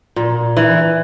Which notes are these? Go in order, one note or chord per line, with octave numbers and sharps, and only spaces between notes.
A#2
E3